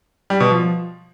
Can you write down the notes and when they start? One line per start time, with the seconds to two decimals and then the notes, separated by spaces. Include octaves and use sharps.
0.30 G3
0.40 B2
0.51 F3